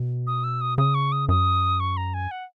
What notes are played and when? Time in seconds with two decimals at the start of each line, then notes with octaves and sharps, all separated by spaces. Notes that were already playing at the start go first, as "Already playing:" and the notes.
Already playing: B2
0.27 D#6
0.44 E6
0.61 D#6
0.78 C#3 D#6
0.95 C#6
1.12 D#6
1.29 F#2 D#6
1.80 C#6
1.97 A#5
2.14 G#5
2.31 F#5